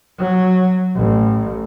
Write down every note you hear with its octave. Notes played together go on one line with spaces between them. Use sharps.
F#3
A1